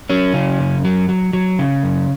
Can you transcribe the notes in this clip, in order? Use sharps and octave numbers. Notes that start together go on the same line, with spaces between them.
F#3 C#4
C#3
F#2
F#3
F#3
F#3
C#3
F#2